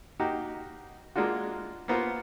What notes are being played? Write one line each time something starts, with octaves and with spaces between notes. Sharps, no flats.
A#3 D#4 F#4 G4
G#3 A#3 D4 F4 F#4
A#3 B3 F4 C5